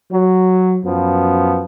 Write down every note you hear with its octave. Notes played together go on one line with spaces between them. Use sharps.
F#3
F#2 F3 B3